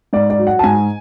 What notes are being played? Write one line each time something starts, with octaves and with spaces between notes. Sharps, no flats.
G#2 D5
D5
F#3
F#5
A5
G#2 G#5